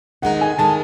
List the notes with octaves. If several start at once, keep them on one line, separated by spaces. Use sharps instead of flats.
D#3 G#3 D#4 F#5
G#5
D#3 G#3 D#4 A5